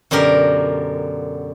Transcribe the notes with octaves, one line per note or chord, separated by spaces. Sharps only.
F#2 B2 D3 G4 A#4